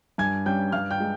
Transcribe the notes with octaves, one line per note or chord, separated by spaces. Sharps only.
G2 G#5 G#6
G3 C#4 G5 G6
G2 F5 F6
G5 G6
G#3